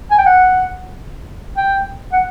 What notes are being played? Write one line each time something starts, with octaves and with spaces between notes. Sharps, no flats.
G#5
G5
F#5
G5
F#5